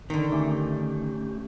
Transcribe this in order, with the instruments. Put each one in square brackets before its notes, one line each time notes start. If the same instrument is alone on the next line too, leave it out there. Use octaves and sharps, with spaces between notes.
[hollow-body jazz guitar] D3 D#3
[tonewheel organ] A3 C#4 G4